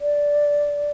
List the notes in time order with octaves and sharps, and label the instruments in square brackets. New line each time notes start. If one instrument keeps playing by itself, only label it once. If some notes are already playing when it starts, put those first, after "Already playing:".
[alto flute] D5